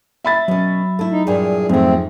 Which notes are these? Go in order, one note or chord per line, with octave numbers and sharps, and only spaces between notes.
E5 B5 A6
B2 F#3 C#4
A3 E4
D#4
G2 A#2 E3 G#4
F2 G#2 A3 C4 G#4